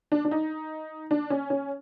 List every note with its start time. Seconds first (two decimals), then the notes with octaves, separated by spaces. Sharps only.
0.12 D4
0.25 D4
0.31 D#4
1.11 D4
1.30 C#4
1.50 C#4